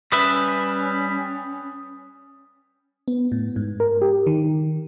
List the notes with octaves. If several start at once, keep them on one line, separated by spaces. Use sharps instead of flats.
G3 C#4 B4 E5 D#6
B3
A2
G#2
A#4
G4
D#3